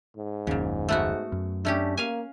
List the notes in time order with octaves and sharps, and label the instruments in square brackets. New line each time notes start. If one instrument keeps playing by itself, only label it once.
[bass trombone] G#2
[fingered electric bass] F#1 D#2 [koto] A#2 C#3
[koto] A3 B3 F#4
[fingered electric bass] F#2
[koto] A3 C#4 G4 [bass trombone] D4
[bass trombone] A#3 [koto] F5 G#5